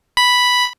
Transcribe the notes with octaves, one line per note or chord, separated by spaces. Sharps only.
B5